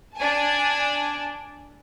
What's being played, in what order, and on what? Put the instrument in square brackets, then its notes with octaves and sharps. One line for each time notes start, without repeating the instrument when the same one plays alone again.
[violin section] D4 G#5 A5